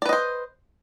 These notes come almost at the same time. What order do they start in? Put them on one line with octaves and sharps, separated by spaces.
D5 B4 D#5 C5